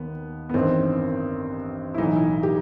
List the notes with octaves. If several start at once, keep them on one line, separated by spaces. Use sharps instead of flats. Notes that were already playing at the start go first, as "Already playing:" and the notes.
Already playing: D#2 D#3 B3
B3
A1 G2 D#3 C4
E4
B1 A2 E3 D#4
E4
G4